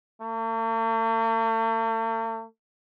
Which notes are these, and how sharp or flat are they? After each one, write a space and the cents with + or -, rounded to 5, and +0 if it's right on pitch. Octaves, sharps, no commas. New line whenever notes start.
A3 +45